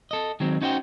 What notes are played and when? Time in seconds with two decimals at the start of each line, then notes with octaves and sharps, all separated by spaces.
0.11 A4 D#5
0.40 D#3 F#3 G#3 C4
0.61 C#4 D#4 F#4 C5 D#5 G5